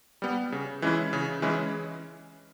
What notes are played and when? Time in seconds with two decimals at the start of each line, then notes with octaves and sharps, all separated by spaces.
0.22 G3 B3
0.52 C#3
0.82 E3 G#3 C#4 E4
1.13 C#3
1.42 E3 G#3 C#4 E4